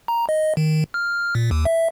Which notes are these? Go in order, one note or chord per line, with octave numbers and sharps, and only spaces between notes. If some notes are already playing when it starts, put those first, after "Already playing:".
A#5
D#5
D#3
F6
A#2
D#2
E5